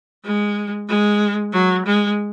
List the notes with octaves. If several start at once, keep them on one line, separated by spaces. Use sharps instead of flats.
G#3
G#3
F#3
G#3